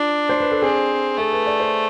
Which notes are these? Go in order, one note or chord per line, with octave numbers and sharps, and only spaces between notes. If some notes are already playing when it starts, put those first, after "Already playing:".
Already playing: D4 F4
C5
B4
A4
C4 G#4
A3 A4
B4
D5
C5